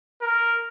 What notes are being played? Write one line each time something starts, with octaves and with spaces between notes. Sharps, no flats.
A#4